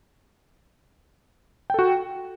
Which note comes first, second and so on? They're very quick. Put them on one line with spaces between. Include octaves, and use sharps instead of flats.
G5 A4 F#4